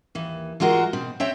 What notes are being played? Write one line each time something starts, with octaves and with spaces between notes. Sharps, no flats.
D#2 E3
E3 G#3 F4 F#4 A#4
B2 C4
C4 C#5 E5 G5